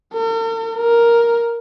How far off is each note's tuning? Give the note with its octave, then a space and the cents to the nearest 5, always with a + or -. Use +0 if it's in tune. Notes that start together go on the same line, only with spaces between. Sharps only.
A#4 -45
A#4 +5